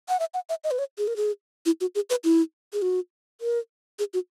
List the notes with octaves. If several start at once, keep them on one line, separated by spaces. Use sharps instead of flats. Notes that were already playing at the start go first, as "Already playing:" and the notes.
F#5
E5
F#5
E5
D#5
B4
C#5
G#4
A#4
G#4
E4
F#4
G#4
B4
E4
G#4
F#4
A#4
G#4
F#4